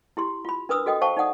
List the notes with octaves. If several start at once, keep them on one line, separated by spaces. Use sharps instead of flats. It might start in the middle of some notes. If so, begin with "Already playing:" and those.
E4 G4 C6
F4 B5
D4 A#4 B4 D#6 E6
F#4 A4 D#5 G5 D#6
C5 F5 G5 A5 C#6
D#4 D5 F#5 D#6